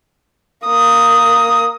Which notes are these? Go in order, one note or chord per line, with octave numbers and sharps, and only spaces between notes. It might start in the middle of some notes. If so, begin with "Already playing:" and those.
A#3 D#6